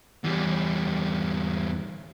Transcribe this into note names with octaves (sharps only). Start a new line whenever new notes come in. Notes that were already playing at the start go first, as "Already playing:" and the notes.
E2 G3